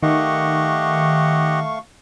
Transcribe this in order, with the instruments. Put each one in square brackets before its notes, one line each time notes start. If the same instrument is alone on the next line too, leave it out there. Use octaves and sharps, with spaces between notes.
[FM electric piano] D#3 [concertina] A3 F5 C#6 [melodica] G4 D#5 F#5